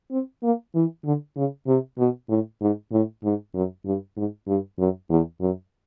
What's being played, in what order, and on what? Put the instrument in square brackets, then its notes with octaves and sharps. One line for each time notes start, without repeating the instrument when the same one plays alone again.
[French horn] C4
A#3
E3
D3
C#3
C3
B2
A2
G#2
A2
G#2
F#2
G2
G#2
G2
F#2
E2
F#2